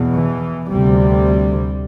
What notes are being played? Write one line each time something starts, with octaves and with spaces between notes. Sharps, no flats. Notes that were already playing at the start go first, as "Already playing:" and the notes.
Already playing: E2 B2
E3
D2 C3 G3